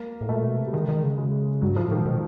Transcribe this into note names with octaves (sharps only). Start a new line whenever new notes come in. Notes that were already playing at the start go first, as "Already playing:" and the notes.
Already playing: A#3
A2
A#2 A3
B2
C3
G3
D#3 G#3
D#3
C#3
G#3
G2 F#3
G#2 F3
A2
A#2 D#3
B2